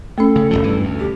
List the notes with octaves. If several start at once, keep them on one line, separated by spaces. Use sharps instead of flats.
A3 C#4 A4
C#3
D1 G#1 F3
G2 E3
D2
G4